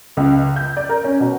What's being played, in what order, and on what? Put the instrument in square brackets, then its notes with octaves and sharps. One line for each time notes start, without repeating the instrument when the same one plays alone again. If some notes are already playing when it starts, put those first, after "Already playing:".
[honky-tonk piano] C#2
G6
D5
A#4
C#4
B2